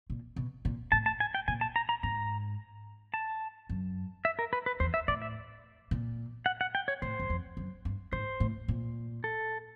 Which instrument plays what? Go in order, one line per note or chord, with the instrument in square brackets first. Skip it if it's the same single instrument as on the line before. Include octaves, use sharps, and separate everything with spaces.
[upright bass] A#2
B2
A#2
[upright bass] A2 [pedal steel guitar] A5
[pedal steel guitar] A5
G#5
G5
[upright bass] A#2 [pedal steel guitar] G#5
[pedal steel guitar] A5
A#5
A#5
[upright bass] G#2 [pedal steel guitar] A#5
[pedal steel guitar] A5
[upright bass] F#2
[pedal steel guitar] E5
A#4
B4
B4
[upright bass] E2 [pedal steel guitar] C5
[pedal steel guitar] E5
[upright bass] A2 [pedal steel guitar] D5
[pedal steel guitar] E5
[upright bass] A#2
[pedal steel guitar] F#5
F#5
G5
C#5
[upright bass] A2 [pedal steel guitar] C5
[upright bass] F#2
F2
F#2
G2
[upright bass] G#2 [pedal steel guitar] C5
[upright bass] A2
A#2
[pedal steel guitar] A4